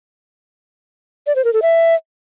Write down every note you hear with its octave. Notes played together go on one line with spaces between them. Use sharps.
D5
C5
A#4
A4
E5